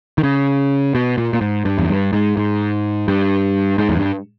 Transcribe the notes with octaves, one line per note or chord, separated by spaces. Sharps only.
D#3
C#3
B2
A#2
A#2
G#2
G2
E2
G2
G#2
G#2
G2
G#2
E2
G2